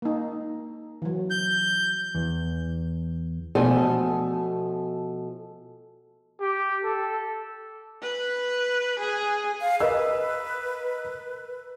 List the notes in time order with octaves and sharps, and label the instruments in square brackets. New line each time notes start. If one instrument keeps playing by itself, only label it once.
[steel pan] A#3 D#4
E3 F#3
[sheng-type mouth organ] G6
[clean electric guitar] E2
[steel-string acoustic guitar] B2 F3 A3 G#5
[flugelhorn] G4
A4
[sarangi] B4
G#4
[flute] F5
[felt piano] A#4 D#5 E6 [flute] B4